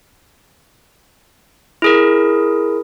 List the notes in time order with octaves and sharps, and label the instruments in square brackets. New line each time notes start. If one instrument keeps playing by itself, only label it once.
[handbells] E4 G#4 A#4